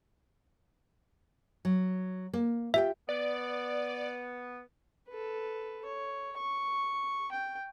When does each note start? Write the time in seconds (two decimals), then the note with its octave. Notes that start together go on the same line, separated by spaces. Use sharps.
1.65 F#3
2.33 A#3
2.74 F4 G4 E5 G5
3.09 B3 D5
5.09 A4 B4
5.85 C#5
6.38 C#6
7.31 G5